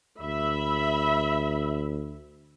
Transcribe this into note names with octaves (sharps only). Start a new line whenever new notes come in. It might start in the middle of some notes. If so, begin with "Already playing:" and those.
D2 E5 B5